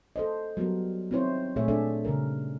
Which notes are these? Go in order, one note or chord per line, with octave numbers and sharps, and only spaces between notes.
A4 C5 D#5
F#3 G3 B3 F#4 A#4
C4 D#4 E4 C5 C#5
A#2 A3 G#4 C#5 E5
A3 D4 G#4 A4 D5 E5
C#3 G3 A#4